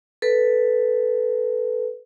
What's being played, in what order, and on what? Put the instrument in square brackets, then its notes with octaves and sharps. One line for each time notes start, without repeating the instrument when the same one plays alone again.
[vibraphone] A4 B4